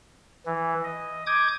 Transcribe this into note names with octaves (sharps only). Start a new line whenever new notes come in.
E3
D#5
D6 D#6 G6 G#6